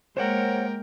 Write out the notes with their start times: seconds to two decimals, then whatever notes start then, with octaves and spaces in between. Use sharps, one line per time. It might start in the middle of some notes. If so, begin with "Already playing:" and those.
0.17 G#3 A#3 A#4 C5 C#5 F#5 G5